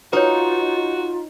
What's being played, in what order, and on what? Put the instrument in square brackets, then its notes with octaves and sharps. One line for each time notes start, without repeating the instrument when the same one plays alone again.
[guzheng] D#4 [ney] F4 [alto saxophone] F#4 [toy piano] B4 C#5